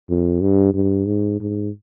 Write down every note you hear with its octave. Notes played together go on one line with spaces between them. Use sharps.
F2
G2
G2
G#2
G#2